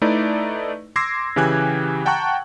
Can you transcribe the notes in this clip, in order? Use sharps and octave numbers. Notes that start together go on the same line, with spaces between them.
A3 D#4 E4 B4 D5
C6 D6 E6 G#6 A#6 C7
C#3 E3 G4 G#5 F#6 G#6
F#5 G5 A5 A#5 C#6 F#6